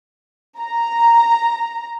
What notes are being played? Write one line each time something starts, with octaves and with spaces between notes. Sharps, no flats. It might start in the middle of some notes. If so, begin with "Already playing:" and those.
A#5